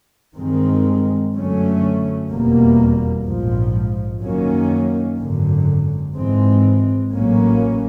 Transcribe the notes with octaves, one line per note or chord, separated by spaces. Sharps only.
G2 D#3 G#3 C4
F#2 D3 F#3 A3 C#4
F1 E2 B2 G3 A#3
A#1 G#2 F3
F#2 D#3 F#3 A#3 C#4
G#1 F#2 D3
G#1 G#2 E3 G#3 C4
A1 A2 F#3 A#3 C#4